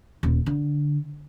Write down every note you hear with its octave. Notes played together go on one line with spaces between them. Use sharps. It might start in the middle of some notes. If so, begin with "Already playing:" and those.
D#1
D3